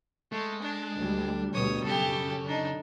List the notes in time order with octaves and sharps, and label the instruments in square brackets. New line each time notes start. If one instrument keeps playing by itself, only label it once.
[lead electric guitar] G#3 [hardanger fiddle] A3
[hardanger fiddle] D4
[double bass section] D2 G3
[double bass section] D2 B2 G3 [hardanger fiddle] C#5 D#6
[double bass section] F#2 [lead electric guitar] C#3 [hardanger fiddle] G4 A4
[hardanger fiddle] D4 D#4